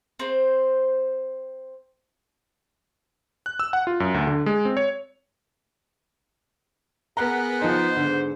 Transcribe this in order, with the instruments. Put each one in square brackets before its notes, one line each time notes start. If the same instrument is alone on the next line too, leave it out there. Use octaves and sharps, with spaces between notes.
[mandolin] C4 C5
[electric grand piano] F#6
E6
F#5
F4
F#2
D2
D3
G#3
C4
C#5
[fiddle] B3 [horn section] G#4 A#4 F#5 [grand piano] A#5
[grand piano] F3 D#4 [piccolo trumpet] C5
[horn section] G#2 [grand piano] D3